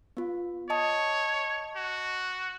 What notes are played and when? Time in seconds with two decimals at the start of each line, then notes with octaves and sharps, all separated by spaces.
0.17 B3 F4
0.70 C#5 D#5 A5 D#6
1.76 F#4